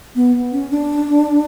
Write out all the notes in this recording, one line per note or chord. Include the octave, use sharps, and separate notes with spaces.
B3
C#4
D4